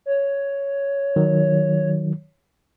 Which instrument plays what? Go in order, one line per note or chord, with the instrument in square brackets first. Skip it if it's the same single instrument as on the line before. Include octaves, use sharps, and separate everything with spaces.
[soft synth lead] C#5
[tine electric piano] D#3 F#3